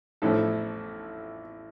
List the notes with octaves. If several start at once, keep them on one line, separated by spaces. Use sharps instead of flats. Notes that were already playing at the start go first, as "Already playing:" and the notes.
A1 A2 F3 A4